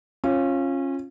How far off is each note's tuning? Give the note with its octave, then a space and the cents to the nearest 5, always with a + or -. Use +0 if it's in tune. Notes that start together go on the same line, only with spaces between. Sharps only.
C#4 -25 F4 +0